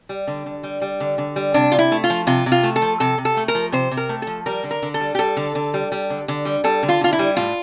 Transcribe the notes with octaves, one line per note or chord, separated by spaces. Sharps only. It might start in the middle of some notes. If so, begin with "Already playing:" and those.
G3
D3
D3
G3
G3
D3
D3
G3
C3 D4
C3 F4
E4
A3
F4
F3
C3 F4
C3
F4
A3
A4
F3
C3 A4
C3
A4
A3
A#4
F3
C3 C5
C3
A#4
A3
F3 A4
G3 A#4
D3
A#4
D3
A4
G3
G4
G3 A4
D3
D3
G3
G3
D3
D3
G3
G3 A4
D3
F4
D3 F4
E4
G3
A2 F4